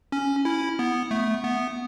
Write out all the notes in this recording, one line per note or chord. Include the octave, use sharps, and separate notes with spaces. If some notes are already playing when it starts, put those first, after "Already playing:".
C#4
E4
B3
A3
B3